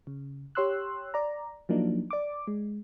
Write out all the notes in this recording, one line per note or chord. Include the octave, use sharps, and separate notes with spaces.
C#3
G4 C#5 C6 E6 F#6
D5 A#5
F3 F#3 A#3 D4 D#4
D5 D6
G#3